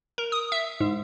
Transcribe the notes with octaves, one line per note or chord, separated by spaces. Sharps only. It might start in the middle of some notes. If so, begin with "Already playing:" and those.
A#4
D#6
E5
G#2